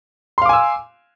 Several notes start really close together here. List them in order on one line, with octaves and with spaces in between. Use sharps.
C6 F5 D6 G#5 E6